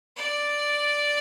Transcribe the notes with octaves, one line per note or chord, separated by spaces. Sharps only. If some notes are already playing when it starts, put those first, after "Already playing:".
D5